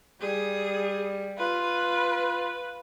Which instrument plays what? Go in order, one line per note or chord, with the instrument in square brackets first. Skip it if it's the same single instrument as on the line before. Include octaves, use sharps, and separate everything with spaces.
[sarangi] G3 [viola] G#4
[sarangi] F4 [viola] B4